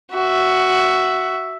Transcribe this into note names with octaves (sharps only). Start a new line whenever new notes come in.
F#4 E5